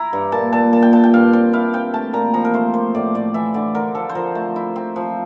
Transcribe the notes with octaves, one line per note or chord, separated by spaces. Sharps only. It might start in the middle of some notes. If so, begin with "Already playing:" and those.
Already playing: E4 A#5
G2
A#2 A5
A#2 A5
A#2 A5
G5
A#2 A5
G5
G2 F5
C4 G5
E4 F5
C4 G5
A3 A5
A#2 A#5
F3 A#5
A#4
A3 C5
A#3 C5
A2 D5
A2 D5
E3 E5
D3 D5
D3 A#4
F3 A4
C5
F3 A#4
A3
E4
C4
F3